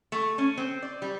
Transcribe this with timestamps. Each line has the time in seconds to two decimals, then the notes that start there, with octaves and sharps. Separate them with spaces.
0.12 A3
0.38 C#4
0.57 C4
0.82 D5
1.02 G3